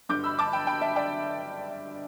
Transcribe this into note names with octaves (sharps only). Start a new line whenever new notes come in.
G1 G2 D3 D6 G6
B5 E6
A5 D6
G5 B5
G5 B5
E5 A5
D5 G5